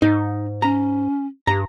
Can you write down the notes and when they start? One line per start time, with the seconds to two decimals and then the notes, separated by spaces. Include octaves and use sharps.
0.02 G#2 D#4
0.62 C#4 A#5
1.47 G2 G4 A#5